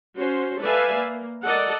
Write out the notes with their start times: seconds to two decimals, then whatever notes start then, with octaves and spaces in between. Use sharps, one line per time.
0.18 C#4 F#4 C5
0.61 A4 B4 D5 E5 F5 G#5
0.95 A#3
1.45 A4 A#4 D5 D#5 F#5